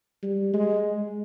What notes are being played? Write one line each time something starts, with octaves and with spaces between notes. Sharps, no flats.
G3
G#3